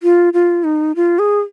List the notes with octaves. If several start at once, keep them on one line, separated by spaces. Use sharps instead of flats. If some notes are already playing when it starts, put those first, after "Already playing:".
F4
F4
D#4
F4
G#4